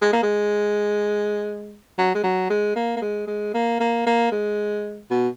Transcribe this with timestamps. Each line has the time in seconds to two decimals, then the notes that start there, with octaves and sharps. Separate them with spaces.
0.02 G#3
0.13 A#3
0.23 G#3
1.98 F#3
2.15 G#3
2.23 F#3
2.50 G#3
2.76 A#3
2.97 A#3
3.02 G#3
3.27 G#3
3.54 A#3
3.80 A#3
4.06 A#3
4.32 G#3
5.11 B2